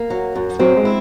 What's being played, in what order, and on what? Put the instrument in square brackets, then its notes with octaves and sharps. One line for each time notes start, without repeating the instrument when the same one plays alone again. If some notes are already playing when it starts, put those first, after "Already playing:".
Already playing: [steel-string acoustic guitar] A#3
F#3
F#2
[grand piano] F#3 [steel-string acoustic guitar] C4
[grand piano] G#3
[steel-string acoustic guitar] E4